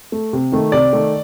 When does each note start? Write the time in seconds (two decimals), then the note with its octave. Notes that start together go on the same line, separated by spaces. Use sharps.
0.12 A3
0.33 C3
0.52 D#3 A3
0.72 C3 D5
0.93 D#3 A3